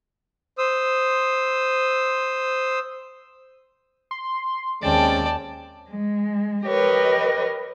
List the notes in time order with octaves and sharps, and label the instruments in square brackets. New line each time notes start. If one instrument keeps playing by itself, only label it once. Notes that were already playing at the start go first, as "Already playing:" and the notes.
[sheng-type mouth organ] C5 D#6 E6
[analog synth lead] C6
[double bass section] D#2 [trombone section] G#3 C4 C#4 [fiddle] D5 G5 [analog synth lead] A5
[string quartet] G#3
G4 A#4 B4 C#5 D#5